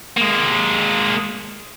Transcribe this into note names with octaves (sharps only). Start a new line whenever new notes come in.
G#3 A#3